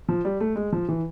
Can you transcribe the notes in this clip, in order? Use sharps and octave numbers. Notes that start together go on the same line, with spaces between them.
F3
G3
A3
G#3
F3
E3